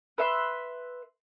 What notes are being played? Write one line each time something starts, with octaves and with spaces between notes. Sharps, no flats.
B4 E5 C6